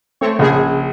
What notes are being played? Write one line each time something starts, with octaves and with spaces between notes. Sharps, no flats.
A3 C4 C#5
A#1 C#3 G#4